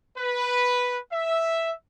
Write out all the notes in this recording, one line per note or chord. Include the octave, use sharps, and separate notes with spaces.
B4
E5